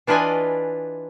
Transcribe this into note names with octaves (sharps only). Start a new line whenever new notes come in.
E3 D4 F4 B4 D#5 G#5